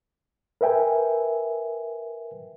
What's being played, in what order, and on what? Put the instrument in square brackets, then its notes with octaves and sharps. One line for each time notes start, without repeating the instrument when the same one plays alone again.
[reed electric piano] A#4 B4 E5 G5 G#5